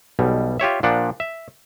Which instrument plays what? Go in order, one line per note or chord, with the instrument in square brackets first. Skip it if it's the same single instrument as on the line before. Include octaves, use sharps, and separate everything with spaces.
[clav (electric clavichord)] B1 B2 G3
F4 G4 C#5 E5
A#2 F3 D4 F#5
E5